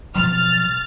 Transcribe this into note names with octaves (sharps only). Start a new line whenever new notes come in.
B2 F3 F#3 F6 A6